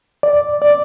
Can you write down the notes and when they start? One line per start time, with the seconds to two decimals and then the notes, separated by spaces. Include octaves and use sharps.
0.23 D5
0.62 D5